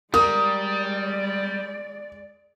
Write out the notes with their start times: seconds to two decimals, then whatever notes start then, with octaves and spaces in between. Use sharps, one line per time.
0.14 G3 G#3 A#4 D5 D#6